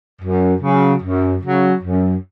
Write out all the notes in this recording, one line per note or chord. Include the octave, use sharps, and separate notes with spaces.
F#2
C#3 F#3
F#2
C#3 F#3
F#2